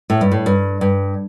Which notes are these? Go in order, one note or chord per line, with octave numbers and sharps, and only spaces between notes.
A2
G2
A2
G2
G2